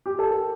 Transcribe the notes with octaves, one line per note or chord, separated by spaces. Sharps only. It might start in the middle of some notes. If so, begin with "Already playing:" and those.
G4
A4
A#4